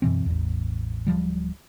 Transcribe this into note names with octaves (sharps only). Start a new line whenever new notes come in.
F#2 B2 E3 C4
A1 E2
D1 G1 F3 G3